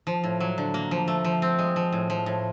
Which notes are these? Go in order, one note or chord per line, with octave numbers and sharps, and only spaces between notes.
F3
A2
F#3
D3
A#3
F3
A3
F3
C4
G#3
F3
A2
F3
A2